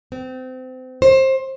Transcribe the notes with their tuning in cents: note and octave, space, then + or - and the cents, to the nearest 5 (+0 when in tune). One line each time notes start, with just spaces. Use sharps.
C4 -30
C5 +25